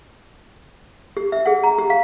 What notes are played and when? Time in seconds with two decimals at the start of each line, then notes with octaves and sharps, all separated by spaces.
1.17 G4
1.32 E5
1.46 G#4 F#5
1.63 A#5
1.78 G4
1.90 F5